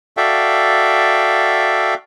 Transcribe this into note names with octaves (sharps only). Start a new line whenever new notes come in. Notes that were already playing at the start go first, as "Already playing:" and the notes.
F#4 A4 D5 E5 F5 G5